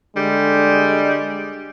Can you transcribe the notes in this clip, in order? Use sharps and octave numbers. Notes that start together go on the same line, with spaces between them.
D3 G3 G#3